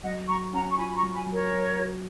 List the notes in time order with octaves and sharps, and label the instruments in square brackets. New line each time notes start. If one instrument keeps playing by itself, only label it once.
[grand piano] F#3 [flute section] D#5 F#5
[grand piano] F#3 [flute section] A#5 C#6
[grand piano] C#4 [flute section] F#5 A#5
[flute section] C#6
[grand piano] F4 [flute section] G#5 B5
[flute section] B5
A#5 C#6
[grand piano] F#3
[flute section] G#5 B5
[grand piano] F#3
[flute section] A#4 C#5
[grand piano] F#3
F#4